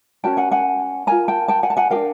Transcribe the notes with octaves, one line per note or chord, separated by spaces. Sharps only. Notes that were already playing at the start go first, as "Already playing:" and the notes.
C#4 F#4 A#4 G5 A5
F#5 G#5
F#5 G#5
F4 A#4 G#5 A#5
G5 A5
G5 A5
F#5 G#5
A5
F#5 G#5
G4 A#4 F5 G5
D4